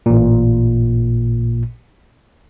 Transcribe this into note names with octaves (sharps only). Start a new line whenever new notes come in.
A1 A#2